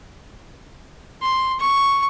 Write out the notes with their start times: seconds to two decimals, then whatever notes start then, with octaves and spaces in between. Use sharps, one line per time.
1.22 C6
1.59 C#6